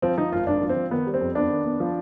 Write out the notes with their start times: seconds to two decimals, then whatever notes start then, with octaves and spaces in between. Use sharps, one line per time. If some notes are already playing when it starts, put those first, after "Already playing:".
0.02 F3 C4
0.18 F3 D#4
0.32 G#1 F4
0.47 G#1 D4
0.62 F3
0.69 C4
0.76 F3
0.91 D#3 B3
1.07 G3
1.14 C4
1.21 F2
1.35 B3 D4
1.50 D#3
1.65 B3
1.80 F3